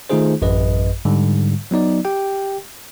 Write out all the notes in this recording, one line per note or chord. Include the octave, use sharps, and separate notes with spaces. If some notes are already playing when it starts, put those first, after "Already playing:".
D#3 A3 D#4 F4 G#4 C5
A1 F#2 B4 D#5
G#2 D3 G3
F#3 B3 D#4 D5
G4 G5